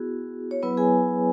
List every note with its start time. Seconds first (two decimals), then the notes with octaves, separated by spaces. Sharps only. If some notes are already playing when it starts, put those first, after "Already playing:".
Already playing: B3 E4 F#4 G#4
0.51 C#5
0.63 F#3 B3 E4 B4
0.77 G#4 G#5